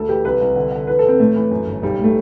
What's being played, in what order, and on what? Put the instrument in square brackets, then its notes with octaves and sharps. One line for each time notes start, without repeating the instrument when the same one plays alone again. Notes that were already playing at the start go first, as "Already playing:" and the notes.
Already playing: [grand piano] D2 A4
E3 G4
C2 B4
C2
D3
D3
E3 B4
E3 A4
C4
A2 A3
E3
F#2
G1
B1 G3
A2 A3